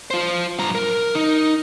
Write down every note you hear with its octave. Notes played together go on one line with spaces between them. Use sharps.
F4 C5
G2 A#5
A#4
D#4